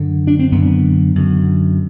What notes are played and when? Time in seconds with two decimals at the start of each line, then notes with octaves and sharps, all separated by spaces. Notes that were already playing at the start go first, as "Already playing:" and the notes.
Already playing: F#2 D3
0.27 D4
0.39 C4
0.52 F#2 D3 B3
1.15 F#2 D3